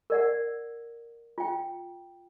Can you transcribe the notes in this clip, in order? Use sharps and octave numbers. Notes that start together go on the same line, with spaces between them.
A#4 D5 F#5
F4 G5